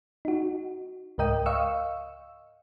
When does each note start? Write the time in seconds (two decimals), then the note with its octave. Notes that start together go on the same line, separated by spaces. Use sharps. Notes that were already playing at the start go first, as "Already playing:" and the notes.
0.25 D#4 F#4
1.18 C#2 G#2 A#4 D#5 G5 D#6
1.46 D#5 F5 C#6 E6